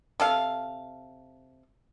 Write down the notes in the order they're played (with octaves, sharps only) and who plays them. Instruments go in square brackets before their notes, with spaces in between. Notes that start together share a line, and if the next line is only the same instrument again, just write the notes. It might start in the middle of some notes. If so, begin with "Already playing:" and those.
[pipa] C3 A4 F5